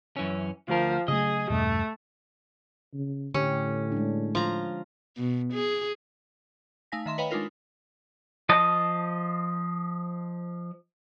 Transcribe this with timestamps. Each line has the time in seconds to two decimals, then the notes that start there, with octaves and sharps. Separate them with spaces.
0.16 F#2 E3 C#4
0.68 D2 F3 A#4
1.08 C#3 F#3 A3 G#4 D#5
1.50 E2 G2 B2 A3
2.94 C#3
3.34 A2 D3 C#4 G4
3.92 G#3 D4
4.35 F3 F4 A#5
5.17 B2
5.53 G#4
6.92 A3 D#4 F5 G#5 A#6 B6
7.06 D#3 E5 C6 E7
7.18 B4 C#5 D#5 F5 G5 B5
7.31 G#3 D4 D#4 F4 A#4
8.49 F3 D#5 A5